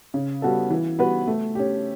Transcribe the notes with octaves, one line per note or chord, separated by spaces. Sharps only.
C#3
G3 B3 F#4 A4
E3
G3 B3 F#4 B4
A3
C#4 G4